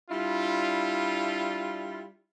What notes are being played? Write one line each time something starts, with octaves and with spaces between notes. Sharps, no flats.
G3 D4 E4 F4